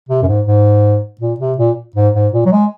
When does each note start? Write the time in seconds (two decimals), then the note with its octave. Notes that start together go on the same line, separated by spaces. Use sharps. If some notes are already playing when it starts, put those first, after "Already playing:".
0.09 C3
0.23 F#2
0.28 G#2
0.46 G#2
1.21 A#2
1.40 C3
1.58 A#2
1.95 G#2
2.15 G#2
2.33 A#2
2.45 F#3
2.52 G#3